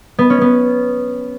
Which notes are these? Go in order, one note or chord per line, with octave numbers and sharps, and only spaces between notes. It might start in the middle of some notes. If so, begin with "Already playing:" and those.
B3
C#4
B3